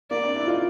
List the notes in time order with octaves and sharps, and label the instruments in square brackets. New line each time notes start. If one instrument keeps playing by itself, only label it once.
[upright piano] A#3 [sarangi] D5
[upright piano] C4 D4
D4 E4
D#4 F4